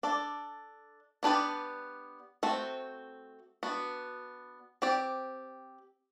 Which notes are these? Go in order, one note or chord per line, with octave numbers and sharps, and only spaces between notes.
D4 A4 D5
B3 D4 G4 B4 D5
A3 C4 F#4 C5
B3 D4 F#4
C4 G4 D5